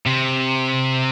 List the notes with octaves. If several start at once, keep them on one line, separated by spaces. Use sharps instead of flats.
C3